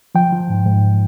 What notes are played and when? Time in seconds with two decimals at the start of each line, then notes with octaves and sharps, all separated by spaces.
0.15 F3 G5
0.32 F3
0.50 G#2
0.66 G#2